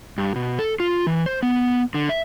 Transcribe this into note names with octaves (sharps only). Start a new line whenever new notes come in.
G2
B2
A4
F4
E3
C5
B3
D3
E5